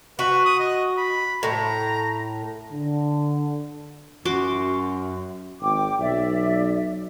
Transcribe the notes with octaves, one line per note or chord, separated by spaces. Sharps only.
F#4 B4
D#6
D#5
B5
A2 A#5
D3
F#2 F#4 C6 D6
G#1 G5 D6
B1 D5 E5